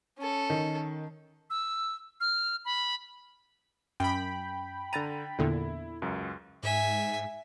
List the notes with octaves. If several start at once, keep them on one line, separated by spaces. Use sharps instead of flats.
C#4 A4
D#3
E6
F6
B5
F#2 G5 B5
D3 A#5 A6 D#7
E2 A#2 D3 E4
C#2 F#2
G#2 E5 G#5